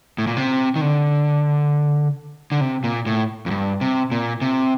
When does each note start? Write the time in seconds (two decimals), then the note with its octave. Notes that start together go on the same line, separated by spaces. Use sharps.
0.18 A2
0.27 A#2
0.37 C3
0.76 D#3
0.81 D3
2.52 D3
2.61 C3
2.84 A#2
3.06 A2
3.46 F2
3.51 G2
3.81 C3
4.11 A#2
4.41 C3